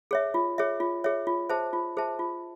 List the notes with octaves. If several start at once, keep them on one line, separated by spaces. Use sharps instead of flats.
G#4 C#5 E5
F4
G#4 C#5 E5
F4
G#4 C#5 E5
F4
G#4 C5 E5 A5
F4
G#4 C5 E5 A5
F4